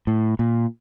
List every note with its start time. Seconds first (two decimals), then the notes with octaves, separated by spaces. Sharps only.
0.07 A2
0.39 A#2